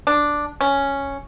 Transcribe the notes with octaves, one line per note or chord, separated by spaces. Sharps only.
D4
C#4